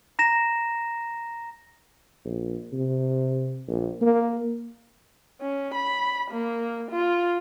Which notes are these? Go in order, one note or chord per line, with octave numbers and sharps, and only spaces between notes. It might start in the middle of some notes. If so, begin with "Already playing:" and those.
A#5 A#6 E7
A#1
C3
A#1
A#3
C#4
B5
A#3
F4